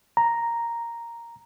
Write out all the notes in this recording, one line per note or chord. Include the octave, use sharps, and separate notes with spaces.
A#5